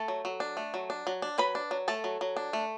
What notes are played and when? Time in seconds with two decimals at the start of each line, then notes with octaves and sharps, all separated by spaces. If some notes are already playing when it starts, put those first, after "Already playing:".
Already playing: A3 A4 A5
0.08 F#3
0.25 F#3
0.40 D4
0.57 A3
0.74 F#3
0.90 D4
1.07 F#3
1.22 D4
1.38 F#3 B4 B5
1.55 D4
1.71 F#3
1.88 A3 A4 A5
2.04 F#3
2.21 F#3
2.37 D4
2.53 A3